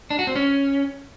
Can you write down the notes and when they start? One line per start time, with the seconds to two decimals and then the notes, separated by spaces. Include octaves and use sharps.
0.10 D4
0.19 F#4
0.27 C4
0.35 C#4